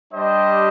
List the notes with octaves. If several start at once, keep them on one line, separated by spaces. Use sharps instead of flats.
G3 D4 G4 C5 D#5